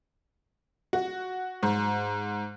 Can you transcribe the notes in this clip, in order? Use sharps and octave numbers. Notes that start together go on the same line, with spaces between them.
F#4
G#2